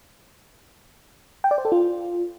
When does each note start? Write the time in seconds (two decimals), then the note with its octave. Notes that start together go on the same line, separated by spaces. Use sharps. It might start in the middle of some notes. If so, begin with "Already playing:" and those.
1.44 G5
1.51 D5
1.58 C5
1.65 A4
1.72 F4